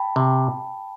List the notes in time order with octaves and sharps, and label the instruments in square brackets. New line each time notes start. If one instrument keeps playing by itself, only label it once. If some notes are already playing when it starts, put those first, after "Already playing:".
Already playing: [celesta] G5 A5 B5
[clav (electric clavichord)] C3